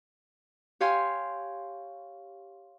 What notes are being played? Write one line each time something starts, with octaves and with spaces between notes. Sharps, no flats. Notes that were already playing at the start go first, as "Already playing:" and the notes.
G4 C#5 F5 G#5 C6